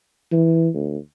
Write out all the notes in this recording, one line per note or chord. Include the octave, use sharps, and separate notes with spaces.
E3
D2